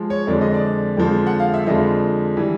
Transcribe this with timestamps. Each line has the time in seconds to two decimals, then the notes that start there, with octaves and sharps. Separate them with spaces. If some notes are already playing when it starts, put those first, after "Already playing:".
Already playing: F3 G#3
0.10 C#5
0.27 F2 D3 F3 G#3 D5
0.41 D#5
0.54 D5
0.97 F2 D3 F3 G#3
1.26 F#5
1.40 F5
1.54 E5
1.67 F2 D3 F3 G#3 D#5
2.37 E3 G3